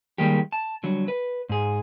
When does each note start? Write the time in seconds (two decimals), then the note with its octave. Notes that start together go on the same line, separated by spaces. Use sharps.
0.18 D#3 G3 G#3 A#3 G4
0.52 A5
0.83 D3 F#3 G3
1.08 B4
1.49 G#2 G#4